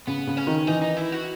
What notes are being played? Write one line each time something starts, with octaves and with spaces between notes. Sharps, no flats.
C#3 B3
C#3
C#4
D#3
E3 D#4
D#4
E4
F#4